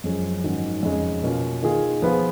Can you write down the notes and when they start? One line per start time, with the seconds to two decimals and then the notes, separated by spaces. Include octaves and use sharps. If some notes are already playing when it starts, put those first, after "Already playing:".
0.04 F#2 F3 G#3 C#4 G#4
0.44 G#2 D#3 F#3 C#4 F#4
0.83 F2 C#3 G#3 C#4
1.23 B2 A#3 C#4 F4
1.63 D#3 A#3 F4 G#4
2.02 F3 B3 F4 G#4